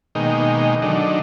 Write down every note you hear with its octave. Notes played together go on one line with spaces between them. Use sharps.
B2 D#3 G#3 A#3 D#4 G5
D3 D#3 F#3 A3 D4 D#4